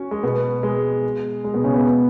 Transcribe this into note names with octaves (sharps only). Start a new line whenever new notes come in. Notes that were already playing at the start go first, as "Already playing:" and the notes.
Already playing: C#4 F#4
G#3
B2 B3
G#3
G#3
B2 B3
C#3 C#4
B2 B3